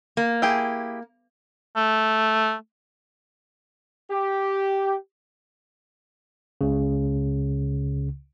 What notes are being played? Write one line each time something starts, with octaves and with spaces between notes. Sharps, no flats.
A#3
E4 G4 G#4
A3
G4
C#2 C#3